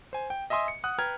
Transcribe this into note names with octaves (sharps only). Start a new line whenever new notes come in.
C5 G#5
G5
D#5 E5 G#5 C6 D#6
C#7
F#5 D#6 F#6
B4 G5 A#5 F6 G#6